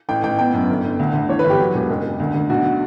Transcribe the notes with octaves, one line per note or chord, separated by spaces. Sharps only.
A1 G5
A1 G5
B3 G5
F#2
G1
G1
D2
D2
E3 C#5
G1 B4
G4
F#3
E1
F#1
F#1
D2
D2
B1 F#4